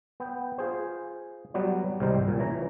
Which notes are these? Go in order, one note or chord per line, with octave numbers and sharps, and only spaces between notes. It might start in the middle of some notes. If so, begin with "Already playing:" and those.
B3 G5
F4 G#4 C5
F#3 G3 B3 B4 D5
C2 G#2 D#3 G3 A#4 C5
A#2 G#5
E3 C#4 A#5